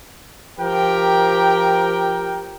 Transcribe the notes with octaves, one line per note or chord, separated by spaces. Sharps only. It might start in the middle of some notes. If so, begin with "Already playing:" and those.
F3 G4 A#4 G5